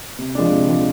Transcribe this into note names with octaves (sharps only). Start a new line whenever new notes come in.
C3
F3 G#3 D4
C3
F3 G#3 D4